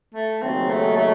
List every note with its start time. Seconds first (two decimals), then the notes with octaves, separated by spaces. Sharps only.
0.14 A3
0.42 D#2 C#3 F#3 C4
0.69 A3
0.97 A3